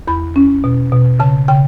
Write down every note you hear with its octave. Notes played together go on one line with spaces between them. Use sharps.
E2 B5
C#4
B2
B2
C#3 A5
C#3 G5